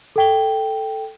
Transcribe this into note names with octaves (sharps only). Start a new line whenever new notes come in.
A4 G5 G7